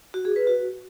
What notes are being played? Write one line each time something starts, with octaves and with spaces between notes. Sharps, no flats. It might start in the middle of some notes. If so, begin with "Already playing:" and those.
F#4
G#4
B4
F#4